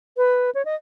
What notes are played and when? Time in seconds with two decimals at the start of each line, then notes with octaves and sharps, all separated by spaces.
0.17 B4
0.55 C#5
0.65 D#5